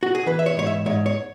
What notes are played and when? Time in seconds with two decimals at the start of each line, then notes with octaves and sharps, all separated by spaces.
0.03 F#4
0.15 G#4
0.26 E3 B4
0.39 E5
0.46 C#5
0.57 G#2 C#5
0.67 E5
0.86 G#2 C#5
1.06 C#5